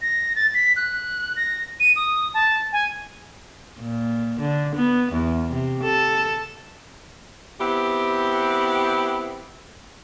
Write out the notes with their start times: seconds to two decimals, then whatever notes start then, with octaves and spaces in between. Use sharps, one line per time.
0.02 A#6
0.36 A6
0.54 B6
0.76 F#6
1.36 A#6
1.80 D#7
1.96 D#6
2.34 A5
2.73 G#5
3.81 A#2
4.40 D3
4.76 B3
5.13 E2
5.52 C3
5.83 A4
7.60 B3 C4 E4 G4